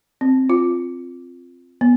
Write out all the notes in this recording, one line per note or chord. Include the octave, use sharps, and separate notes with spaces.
C4
F4
B3